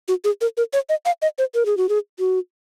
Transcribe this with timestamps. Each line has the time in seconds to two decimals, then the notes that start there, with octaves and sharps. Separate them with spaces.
0.08 F#4
0.24 G#4
0.41 A#4
0.57 A#4
0.73 C#5
0.89 D#5
1.06 F5
1.22 D#5
1.38 C5
1.55 A#4
1.66 G#4
1.77 F#4
1.89 G#4
2.19 F#4